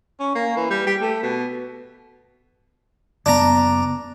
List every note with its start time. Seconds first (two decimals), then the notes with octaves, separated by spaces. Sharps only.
0.20 C#4
0.35 A#3
0.57 E3
0.70 G3
0.87 G4
1.01 A3
1.22 B2
3.26 F#1 B3 D4 A#5